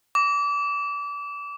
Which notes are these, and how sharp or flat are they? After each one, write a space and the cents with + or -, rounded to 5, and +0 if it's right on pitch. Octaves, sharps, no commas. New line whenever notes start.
D6 -30